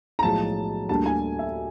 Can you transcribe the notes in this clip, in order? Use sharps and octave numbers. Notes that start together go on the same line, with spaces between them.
A#5
B1 A2 F3 G#3 A5
D2 D3 G3 A#3 A5
G#5
E5